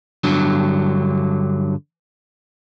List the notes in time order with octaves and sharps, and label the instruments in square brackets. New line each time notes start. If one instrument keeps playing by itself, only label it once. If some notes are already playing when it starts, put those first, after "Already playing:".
[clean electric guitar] G2 D3 F#3